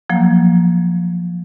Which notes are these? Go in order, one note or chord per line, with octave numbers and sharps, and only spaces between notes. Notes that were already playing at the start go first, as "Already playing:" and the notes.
F3 F#3 A#3